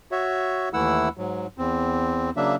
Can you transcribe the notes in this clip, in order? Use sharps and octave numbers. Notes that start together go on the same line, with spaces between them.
F#4 C#5 E5
D#2 E3 A3 E4 F#5 E6
G#2 F#3
E2 C4
C#3 F#3 A#3 D4 E5